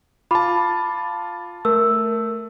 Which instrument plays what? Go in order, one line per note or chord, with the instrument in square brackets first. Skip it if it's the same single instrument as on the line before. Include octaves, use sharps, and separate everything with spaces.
[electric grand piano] F4 A5 [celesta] B5 D6
[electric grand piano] A3 [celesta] A#4 E6